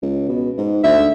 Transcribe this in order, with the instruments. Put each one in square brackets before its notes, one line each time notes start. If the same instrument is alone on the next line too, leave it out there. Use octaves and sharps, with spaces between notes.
[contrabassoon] C#2
B2
G#2
[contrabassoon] D2 [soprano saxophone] E5